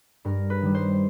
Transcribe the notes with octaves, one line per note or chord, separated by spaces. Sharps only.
G2 A#4
B4
D#3 G3
C5